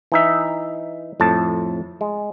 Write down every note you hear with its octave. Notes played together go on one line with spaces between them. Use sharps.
E3 D#4 E5
F2 A2 A5
G#3